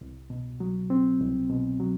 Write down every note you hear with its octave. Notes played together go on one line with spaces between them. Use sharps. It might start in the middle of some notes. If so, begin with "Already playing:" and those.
C2
B2
F#3
C4
C2
B2
F#3